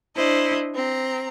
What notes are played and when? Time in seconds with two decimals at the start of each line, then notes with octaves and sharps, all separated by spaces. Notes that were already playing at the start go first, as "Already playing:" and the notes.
0.15 D4 E4 C5 D#5
0.75 C4 A#5